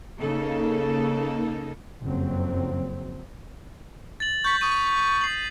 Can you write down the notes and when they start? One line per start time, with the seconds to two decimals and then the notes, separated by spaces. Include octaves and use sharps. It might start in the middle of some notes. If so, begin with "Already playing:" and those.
0.18 C#3 A#3 D#4 A4
2.02 F#1 F2 F#3 C4
4.20 A6 F#7
4.44 C#6 G6 B6
4.61 C#6 D#6 D#7
5.21 C7 F#7